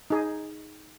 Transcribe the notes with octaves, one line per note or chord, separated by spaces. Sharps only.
D#4 G#4